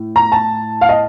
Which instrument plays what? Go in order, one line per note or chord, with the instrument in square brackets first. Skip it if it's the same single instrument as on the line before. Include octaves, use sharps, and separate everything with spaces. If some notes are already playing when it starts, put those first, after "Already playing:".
Already playing: [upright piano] A2
A#5
A5
F5
D#5